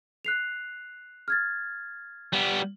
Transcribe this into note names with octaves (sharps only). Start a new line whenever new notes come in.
F#6 C7 F7
F6 G#6 A6
G3 B3